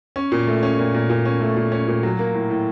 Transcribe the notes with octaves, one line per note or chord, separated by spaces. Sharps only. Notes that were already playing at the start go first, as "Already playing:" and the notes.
C#4
A#2
A3
C#4
A#2
A#2
A#2
C#4
A3
A#2
C#4
A#2
F#3
A#3
A2
A2